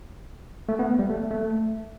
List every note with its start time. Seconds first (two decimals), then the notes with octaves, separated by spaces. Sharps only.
0.69 A3
0.79 B3
0.99 G3
1.10 A3
1.31 A3